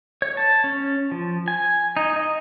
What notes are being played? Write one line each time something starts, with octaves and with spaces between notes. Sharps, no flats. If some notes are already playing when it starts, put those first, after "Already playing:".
C#5
A5
C#4
F3
G#5
D#4
D#5